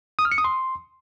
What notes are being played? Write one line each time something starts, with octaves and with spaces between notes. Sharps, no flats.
D#6
F6
C#7
D#6
C6